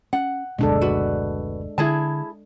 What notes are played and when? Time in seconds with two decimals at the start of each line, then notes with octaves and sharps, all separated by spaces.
0.13 C#4 F#5
0.58 F#1 D2 B2 G#3 D4 A4
0.81 F#4 B4
1.78 D3 E4 G#4 A5